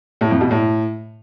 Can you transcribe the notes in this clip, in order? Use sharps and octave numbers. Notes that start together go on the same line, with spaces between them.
A2
F2
B2
A2